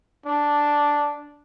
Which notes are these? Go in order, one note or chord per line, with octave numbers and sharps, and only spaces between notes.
D4